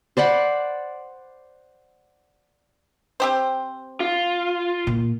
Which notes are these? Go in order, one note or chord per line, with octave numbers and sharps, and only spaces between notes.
C5 D5 F#5 B5
C4 G4 C5
F4
A#2